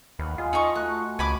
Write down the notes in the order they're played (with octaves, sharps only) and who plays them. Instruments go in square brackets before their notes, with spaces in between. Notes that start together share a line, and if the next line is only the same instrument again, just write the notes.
[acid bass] D#2 [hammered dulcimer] B4 F5 F#5
[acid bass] F4 [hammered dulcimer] G#4 D#5 C6
[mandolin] D#4 C#6 [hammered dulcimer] G#5 A5 C6
[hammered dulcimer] A3 F#4 [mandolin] F#6
[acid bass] C#2 [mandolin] G#5 B5 D6